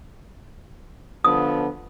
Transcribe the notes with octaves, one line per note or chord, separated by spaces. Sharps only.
D3 F3 B3 D#6